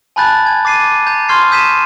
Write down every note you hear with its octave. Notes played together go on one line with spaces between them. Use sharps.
G#5 A5 B5 F#6 G6 A6
G#5 G#6
D6 A6 C7 D#7
A#5 G6 A6
C6 C#6 F6 G6 G#6 C7
D#6 G6 B6 D#7 E7